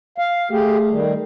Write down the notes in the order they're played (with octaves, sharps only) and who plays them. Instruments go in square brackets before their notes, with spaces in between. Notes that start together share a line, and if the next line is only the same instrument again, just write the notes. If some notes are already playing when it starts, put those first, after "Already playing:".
[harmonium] F5
[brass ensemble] A3 [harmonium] G4 G#4
[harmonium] D#3 G3